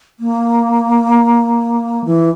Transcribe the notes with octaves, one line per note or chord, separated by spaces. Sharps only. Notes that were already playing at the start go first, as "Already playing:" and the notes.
A#3
E3